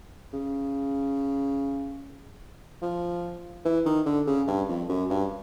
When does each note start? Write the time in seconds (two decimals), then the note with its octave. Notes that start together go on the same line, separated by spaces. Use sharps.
0.33 C#3
2.82 F3
3.65 E3
3.86 D#3
4.06 D3
4.27 C#3
4.48 G2
4.69 F2
4.89 F#2
5.10 G2